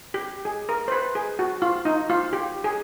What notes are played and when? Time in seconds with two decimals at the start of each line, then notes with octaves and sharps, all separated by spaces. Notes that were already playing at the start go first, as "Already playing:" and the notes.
0.14 G4
0.45 G#4
0.69 A#4
0.88 C5
0.92 B4
1.15 G#4
1.39 F#4
1.62 F4
1.85 D#4
2.10 F4
2.33 G4
2.64 G#4